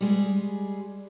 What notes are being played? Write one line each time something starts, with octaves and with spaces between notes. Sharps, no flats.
G3 G#3 G#4